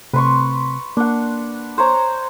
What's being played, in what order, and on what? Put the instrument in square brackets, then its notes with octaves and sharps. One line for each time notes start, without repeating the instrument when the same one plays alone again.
[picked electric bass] C3 A3 C4 [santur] B4 C6 C#6
[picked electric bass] A#3 [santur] D4 F#5
[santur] C5 C#5 A#5